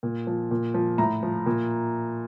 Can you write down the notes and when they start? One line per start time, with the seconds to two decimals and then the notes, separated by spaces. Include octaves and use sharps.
0.03 A#2
0.27 F3
0.51 A#2
0.74 F3
0.98 A2 A#5
1.23 F3
1.46 A#2